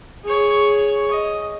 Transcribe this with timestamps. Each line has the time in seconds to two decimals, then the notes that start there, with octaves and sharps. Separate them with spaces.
0.24 G#4 C#5
1.11 D#5